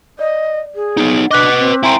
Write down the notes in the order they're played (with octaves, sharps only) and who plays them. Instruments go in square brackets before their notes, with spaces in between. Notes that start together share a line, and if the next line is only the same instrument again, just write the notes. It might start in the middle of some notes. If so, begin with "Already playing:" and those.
[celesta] D5 [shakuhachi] D#5
[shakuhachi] G#4
[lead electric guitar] B3 D#4
[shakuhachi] D4 [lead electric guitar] B4 D#5 [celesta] D6 F#6 B6
[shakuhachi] C4
[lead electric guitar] E4 G5 [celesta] G#5 A#5 C6